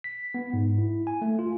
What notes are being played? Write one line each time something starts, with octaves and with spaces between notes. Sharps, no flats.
B6
B3
G#2
E4
G#5
A3
F4